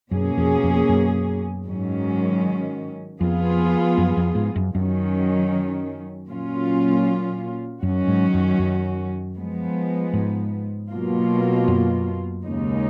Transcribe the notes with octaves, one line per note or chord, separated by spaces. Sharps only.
F#2 B2 A#3 C#4 G#4
F2
F2
F#2
G#2 D#3 F#3 C#4
F2 F3 B3 F4 G#4
F#2
F2
G#2
F#2
F#2 D#3 F#3 C#4
A#2 F#3 C#4 F4
F#2 D#3 F#3 C#4 F#4
G#2
F#2
F#2
F3 G#3 B3
G#2
B2 F#3 A#3 F4
F#2
D#2 C#3 G#3 D#4